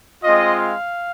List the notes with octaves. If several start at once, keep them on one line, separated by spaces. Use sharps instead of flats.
G#3 C4 F4 D#5
F5